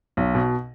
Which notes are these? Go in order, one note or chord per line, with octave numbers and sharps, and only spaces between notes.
B1
B2